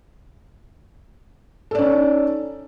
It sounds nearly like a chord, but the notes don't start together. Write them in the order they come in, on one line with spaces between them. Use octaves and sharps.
A4 D5 C#4 D#4